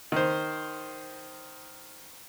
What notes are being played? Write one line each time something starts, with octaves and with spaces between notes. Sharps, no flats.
D#3 C5